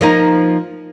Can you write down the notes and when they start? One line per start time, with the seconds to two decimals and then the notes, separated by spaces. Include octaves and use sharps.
0.01 F3 A#3 D#4